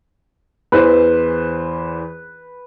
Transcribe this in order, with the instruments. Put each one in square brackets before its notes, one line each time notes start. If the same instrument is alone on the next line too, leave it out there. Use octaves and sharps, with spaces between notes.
[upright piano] E2 E3 C5 [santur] B4